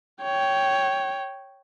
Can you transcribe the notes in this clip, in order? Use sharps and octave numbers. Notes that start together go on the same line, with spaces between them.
C#5 G5